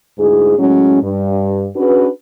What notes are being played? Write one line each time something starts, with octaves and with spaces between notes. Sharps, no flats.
D2 G#2 E4 G#4
A2 F#3 G#3 C#4
G2
C#4 D4 F#4 G#4 B4